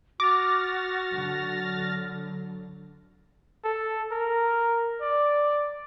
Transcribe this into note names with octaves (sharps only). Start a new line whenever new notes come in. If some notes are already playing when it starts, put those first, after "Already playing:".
F#4 D6 F6 A6 A#6
D3 F#3
A4
A#4
D5